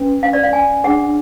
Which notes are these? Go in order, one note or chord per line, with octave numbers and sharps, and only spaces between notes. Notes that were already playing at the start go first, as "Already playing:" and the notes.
Already playing: C#4 B4
F5
D5
F5
G#5
D4 G#4 C#5 F#5